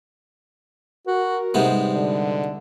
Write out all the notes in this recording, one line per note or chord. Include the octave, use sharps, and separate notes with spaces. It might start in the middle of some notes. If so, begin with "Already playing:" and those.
F#4 A#4
G#2 C3 G3 B3
D3